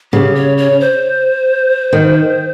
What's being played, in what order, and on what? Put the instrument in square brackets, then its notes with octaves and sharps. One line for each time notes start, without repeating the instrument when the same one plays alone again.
[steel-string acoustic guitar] C#3 [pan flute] G4
[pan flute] C#5
C#5
C5
[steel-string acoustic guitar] D#3